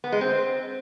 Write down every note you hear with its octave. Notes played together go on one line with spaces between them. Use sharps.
B3
G#3
C4